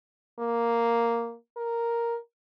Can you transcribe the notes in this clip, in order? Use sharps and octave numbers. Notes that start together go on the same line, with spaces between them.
A#3
A#4